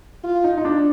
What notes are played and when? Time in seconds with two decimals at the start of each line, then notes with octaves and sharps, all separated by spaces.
0.24 F4
0.44 D#4
0.58 D#4
0.65 D4